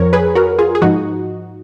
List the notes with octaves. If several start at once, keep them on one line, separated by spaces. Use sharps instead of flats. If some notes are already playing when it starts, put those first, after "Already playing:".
Already playing: F2 F3 A#4 C#5
G#4 B4
F#4 A#4
F4 G#4
G#4
G#2 F3 D#4 F#4